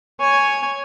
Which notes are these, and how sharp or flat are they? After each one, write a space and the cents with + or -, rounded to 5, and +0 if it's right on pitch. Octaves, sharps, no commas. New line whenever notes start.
C#5 +0 G#5 +0